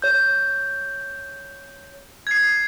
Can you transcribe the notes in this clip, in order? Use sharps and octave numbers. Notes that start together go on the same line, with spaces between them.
C#5 G6
G#6 C7